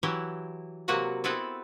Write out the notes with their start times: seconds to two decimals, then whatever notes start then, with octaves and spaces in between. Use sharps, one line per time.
0.03 E3 F#3 E4 G4
0.88 C3 F#3 A#3 F#4 B4 F#5
1.24 B3 C4 E4 A4 B4